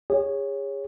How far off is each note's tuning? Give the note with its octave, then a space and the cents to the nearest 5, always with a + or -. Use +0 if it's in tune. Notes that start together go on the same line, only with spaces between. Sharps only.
G#4 -35 C#5 +0